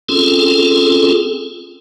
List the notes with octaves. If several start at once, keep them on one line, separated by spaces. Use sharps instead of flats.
C4 C#4 F4 G#4 A4